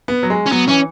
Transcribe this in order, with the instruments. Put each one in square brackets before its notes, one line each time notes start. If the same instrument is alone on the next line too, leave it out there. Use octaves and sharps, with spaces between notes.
[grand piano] B3
F#3
G#3
[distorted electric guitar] C#4
[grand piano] F#3 [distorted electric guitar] B3
[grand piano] E3 [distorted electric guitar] C#4